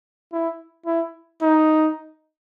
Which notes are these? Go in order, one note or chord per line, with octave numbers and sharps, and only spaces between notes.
E4
E4
D#4